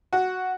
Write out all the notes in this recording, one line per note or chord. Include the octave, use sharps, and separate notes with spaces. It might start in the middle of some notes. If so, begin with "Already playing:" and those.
F#4